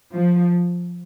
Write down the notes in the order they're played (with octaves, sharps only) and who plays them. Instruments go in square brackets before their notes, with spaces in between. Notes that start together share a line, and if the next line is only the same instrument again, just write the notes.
[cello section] F3